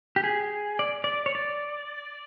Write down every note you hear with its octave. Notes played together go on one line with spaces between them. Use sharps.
G4
G#4
D5
D5
C#5
D5